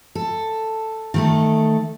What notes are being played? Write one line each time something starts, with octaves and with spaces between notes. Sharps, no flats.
A4
D#3 A3 A4